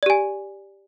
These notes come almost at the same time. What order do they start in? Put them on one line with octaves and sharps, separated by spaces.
D5 G4 G#5